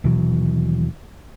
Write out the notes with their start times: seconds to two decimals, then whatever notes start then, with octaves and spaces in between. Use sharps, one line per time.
0.04 D#1 B2 E3 F#3